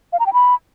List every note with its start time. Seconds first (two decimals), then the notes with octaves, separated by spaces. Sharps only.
0.13 F5
0.20 A#5
0.26 G5
0.33 B5